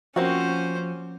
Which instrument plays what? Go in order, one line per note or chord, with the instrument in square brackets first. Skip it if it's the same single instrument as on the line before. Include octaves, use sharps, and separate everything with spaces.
[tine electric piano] F3 [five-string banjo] A#3 C4 F#4 [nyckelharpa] C#4 C5